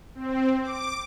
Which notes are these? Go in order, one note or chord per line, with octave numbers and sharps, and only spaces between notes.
C4
D6